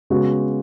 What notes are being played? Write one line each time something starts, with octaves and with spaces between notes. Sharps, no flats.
C#3 G#3 B3 F#4